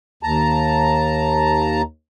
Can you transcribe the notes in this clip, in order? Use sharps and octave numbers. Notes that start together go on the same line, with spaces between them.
D#2 A5 A#5